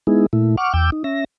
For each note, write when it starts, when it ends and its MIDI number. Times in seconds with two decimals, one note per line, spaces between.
0.07 0.26 56
0.07 0.26 59
0.07 0.26 63
0.07 0.26 64
0.07 0.26 68
0.33 0.56 46
0.33 0.56 57
0.33 0.56 64
0.57 0.73 78
0.57 0.73 85
0.57 0.73 86
0.57 0.73 89
0.73 0.90 40
0.73 0.90 79
0.73 0.90 86
0.73 0.90 88
0.73 0.90 91
0.92 1.03 63
1.04 1.24 61
1.04 1.24 76
1.04 1.24 94